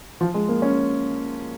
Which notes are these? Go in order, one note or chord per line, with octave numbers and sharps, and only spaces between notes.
F3
G#3
A#3
C#4